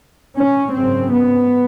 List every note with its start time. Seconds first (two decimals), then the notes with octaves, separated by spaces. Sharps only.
0.36 C#4
0.73 G#1 F#2 C#3 C4
1.11 B3